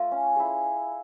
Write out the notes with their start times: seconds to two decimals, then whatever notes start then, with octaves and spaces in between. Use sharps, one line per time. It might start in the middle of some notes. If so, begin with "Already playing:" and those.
Already playing: A3 F4 F5
0.11 C#4
0.36 E4 G#4